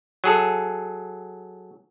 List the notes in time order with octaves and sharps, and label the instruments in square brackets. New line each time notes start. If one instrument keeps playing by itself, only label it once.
[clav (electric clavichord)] F#3 G#4 A4